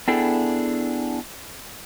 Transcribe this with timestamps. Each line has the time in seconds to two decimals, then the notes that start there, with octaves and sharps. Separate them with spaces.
0.08 B3 D4 E4 G#4 A4 G5